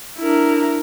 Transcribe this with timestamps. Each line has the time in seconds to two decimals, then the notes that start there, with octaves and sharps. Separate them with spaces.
0.18 D4 E4 A#4